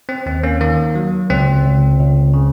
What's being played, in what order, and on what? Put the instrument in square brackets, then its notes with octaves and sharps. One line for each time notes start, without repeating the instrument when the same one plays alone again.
[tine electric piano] C4
D#2 C4
A#3 C#4
D#3 A#3
F#3
C#2 C4
C#2
C#2
C#3